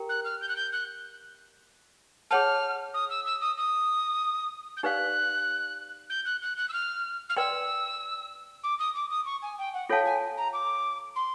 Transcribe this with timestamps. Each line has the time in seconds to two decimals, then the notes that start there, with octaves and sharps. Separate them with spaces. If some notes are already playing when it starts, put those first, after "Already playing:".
Already playing: G4 A#4 G5 A#5
0.09 F#6
0.24 F6
0.41 G6
0.49 F#6
0.56 G6
0.72 F#6
2.30 G#4 C#5 F#5 A5 F6
2.94 D#6
3.10 E6
3.25 E6
3.41 D#6
3.57 D#6
4.77 G6
4.83 D#4 G4 B4 D5 F5 F#6
6.09 G6
6.25 F#6
6.42 F#6
6.57 F#6
6.69 E6
6.73 F6
7.29 F6
7.37 B4 D5 G5 C6 E6
8.63 D6
8.79 D#6
8.95 D6
9.10 D#6
9.25 C#6
9.42 G#5
9.58 G5
9.74 F#5
9.89 F4 A4 C#5 F5 G5 A5
10.05 G#5
10.37 A#5
10.53 D6
11.16 C6